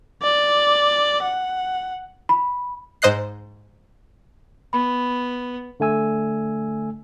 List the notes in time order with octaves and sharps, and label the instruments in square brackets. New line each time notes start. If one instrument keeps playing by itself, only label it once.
[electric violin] D5
F#5
[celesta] B5
[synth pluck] G#2 C5 D#5 F#6 C7
[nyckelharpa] B3 [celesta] B5
[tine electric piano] D3 A3 G#5 E6